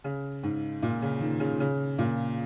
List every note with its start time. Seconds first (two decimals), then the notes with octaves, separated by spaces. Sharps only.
0.04 C#3
0.43 G#2
0.83 A#2
1.02 C#3
1.21 D#3
1.40 C#3
1.60 C#3
1.99 A#2